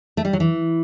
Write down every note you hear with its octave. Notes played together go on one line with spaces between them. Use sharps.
A3
G3
F#3
E3